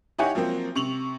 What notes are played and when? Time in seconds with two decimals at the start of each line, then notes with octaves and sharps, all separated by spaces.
0.18 D#4 E4 G4 C#5 F#5 G#5
0.35 F3 F#3 A#3 C4
0.75 C3 C#6 F7 F#7